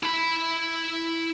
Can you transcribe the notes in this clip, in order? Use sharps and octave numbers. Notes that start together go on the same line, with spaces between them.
E4 B5